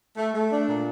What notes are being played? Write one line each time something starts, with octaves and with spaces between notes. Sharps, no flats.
A3
A3
D4
A#2